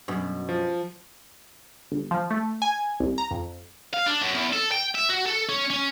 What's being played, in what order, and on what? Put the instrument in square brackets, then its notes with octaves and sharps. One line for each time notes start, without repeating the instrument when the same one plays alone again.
[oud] F#2 B2
[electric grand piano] F3
[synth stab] G1
F3
A3
G#5
C2
A#5
F2
[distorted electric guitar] F5
D4
F#2
E2
A4
G5
E5
F#4
A4
C#4
C#4